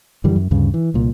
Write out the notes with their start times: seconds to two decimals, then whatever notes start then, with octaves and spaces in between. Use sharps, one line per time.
0.24 F#2 D3 E3 G3
0.36 F#2
0.51 D2 G2 C#3
0.74 E3
0.94 C2 A#2